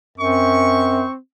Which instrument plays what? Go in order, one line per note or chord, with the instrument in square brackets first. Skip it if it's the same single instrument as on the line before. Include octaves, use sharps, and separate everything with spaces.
[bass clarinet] F#2 [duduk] C4 [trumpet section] C#6